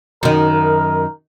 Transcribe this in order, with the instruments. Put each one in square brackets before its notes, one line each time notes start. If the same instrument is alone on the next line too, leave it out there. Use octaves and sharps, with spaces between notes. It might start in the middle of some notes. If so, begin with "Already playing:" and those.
[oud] F#2 D#3 [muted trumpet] A#4